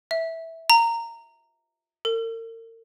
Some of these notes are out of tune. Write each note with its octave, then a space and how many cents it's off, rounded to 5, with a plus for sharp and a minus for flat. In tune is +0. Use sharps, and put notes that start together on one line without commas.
E5 -10
A#5 -15
A#4 -40